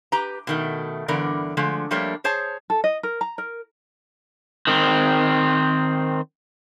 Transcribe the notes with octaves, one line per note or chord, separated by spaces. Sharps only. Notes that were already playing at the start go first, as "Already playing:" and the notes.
G4 B4 A#5
B2 D#3 A3
G2 D3 E3 B3 A#4 D5
D3 F3 G#3 A3
F3 G3 A3 A#3 D4 C#5
G#4 C5 C#5 A5
A4
D#5
A#4
A#5
A#4
D#3 C4